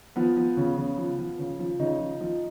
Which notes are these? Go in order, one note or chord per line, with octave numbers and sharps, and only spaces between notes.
F3 B3
F3
C#3
C#3
F3
F3
C#3
F3
C#3 D#4
F3
F3